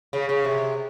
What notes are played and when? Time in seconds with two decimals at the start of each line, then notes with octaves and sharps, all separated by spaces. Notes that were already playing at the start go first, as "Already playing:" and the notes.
0.13 C#3
0.29 C#3
0.44 C3